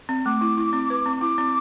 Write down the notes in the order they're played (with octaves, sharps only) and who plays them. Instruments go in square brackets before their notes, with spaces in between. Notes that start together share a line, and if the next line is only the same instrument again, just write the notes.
[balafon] C4
[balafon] A3 [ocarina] D6
[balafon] E4
E4
C4
B4
C4
[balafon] E4 [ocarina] D6
[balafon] C4